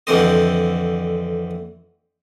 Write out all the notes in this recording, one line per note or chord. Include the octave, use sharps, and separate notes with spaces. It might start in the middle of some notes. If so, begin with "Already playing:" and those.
F2 D3 E3 C4 C5 D#5